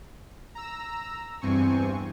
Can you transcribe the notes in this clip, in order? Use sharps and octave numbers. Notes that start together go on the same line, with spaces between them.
A#5 E6
E2 G2 C4 G#5 C#6